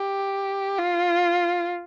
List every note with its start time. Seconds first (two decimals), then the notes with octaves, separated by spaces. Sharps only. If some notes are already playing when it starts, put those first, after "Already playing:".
Already playing: G4
0.79 F4